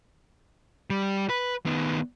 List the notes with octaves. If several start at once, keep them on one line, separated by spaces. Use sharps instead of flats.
G3
B4
D#3 B3